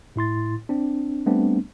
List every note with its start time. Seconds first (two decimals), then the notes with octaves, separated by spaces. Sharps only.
0.16 A2 E4 C6 A6
0.69 C4 D4
1.26 G3 A3 B3 C4 D4